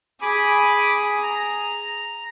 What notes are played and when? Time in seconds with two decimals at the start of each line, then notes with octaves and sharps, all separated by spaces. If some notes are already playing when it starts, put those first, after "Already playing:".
0.22 G#4 G#5 B5 D6
1.23 A#5